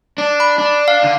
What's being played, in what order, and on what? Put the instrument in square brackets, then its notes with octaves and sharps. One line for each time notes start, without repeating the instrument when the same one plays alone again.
[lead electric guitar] D4
[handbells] B5
[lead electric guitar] D4
[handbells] F5
[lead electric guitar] D3